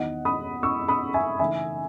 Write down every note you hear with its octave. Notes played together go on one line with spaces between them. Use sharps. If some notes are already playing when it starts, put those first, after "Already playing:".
Already playing: E2 D#3 F#3 B3 D#4 D#5 F#5
B5 D#6
C#6 E6
B5 D#6
E5 G#5
C#3 E3 A3 D#4 E5 G#5